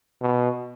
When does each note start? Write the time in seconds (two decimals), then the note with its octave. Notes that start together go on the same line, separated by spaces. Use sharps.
0.21 B2